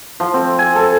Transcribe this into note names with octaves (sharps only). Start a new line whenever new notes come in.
F3
C4
G#5
A4